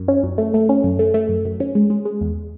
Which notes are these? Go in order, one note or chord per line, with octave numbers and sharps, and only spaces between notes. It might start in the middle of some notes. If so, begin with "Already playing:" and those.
Already playing: F#2
C#4
F#2
A3
A3
C#4
F#2
A3
A3
F#2
F#2
C#4
G#3
G#3
G#3
E2